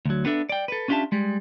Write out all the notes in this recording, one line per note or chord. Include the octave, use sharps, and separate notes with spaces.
D2 F#3
B3 D4 A4 E5
D5 G5
A4 B4
C#4 D4 F4 G4 E5 A5
G3 G#3